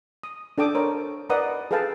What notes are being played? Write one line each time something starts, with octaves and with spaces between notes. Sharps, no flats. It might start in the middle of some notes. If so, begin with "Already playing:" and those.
D#6
D4 A4 G5 D6 D#6
A#4 C5 C#5
A#4 B4 D5 D#5 F#5 D#6
G#4 A4 B4 F5 G5 A5